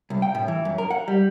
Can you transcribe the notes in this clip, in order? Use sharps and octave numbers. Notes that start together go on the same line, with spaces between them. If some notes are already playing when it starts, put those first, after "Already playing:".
C2
G5
A2
E3
F#2
A#4
F#5
G3